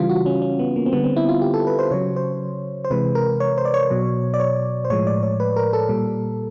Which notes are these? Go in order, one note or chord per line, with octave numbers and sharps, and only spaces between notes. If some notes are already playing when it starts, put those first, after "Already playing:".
Already playing: C#3 E3 G3 F4
F#4
C#4
C#4
B3
A#3
C4
D3 G3 B3
C4
E4
F4
G4
A4
B4
C5
C#3 F#3 C#5
C5
C5
C3 E3 G#3 B4
A#4
C#5
C5
D5
C#5
B2 F#3
D5
C#5
C5
A2 F3 G#3 C#5
D5
C#5
B4
A#4
A4
A#2 G3